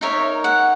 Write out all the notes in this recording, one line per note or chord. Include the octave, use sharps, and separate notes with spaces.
D#4 A#4 C#5 E5
F#5